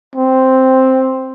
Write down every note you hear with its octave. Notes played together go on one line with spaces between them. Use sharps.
C4